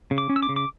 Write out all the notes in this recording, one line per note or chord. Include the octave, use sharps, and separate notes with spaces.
C#3
D6
C#4
E6
D6
C#3
D6